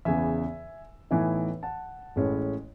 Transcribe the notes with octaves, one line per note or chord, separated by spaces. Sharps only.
E2 C#3 E3 E5 G#5
A2 E3 B3 D#4 E5 G#5
F#5 A5
A1 A2 G#3 C#4 E4